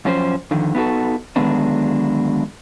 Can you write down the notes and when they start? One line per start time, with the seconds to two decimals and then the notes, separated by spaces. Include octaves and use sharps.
0.05 F#2 F3 C#4 G4 C5
0.51 F2 D3 D#3
0.75 B3 D#4 E4 F#4 A4
1.36 D3 D#3 F#3 G#3 B3 D4